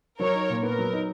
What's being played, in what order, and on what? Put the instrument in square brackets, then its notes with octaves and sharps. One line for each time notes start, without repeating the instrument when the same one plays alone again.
[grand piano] F#3 [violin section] A#4 C#5
[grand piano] D#4
A#2
[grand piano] B3 [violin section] A#4
[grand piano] F#3
D#4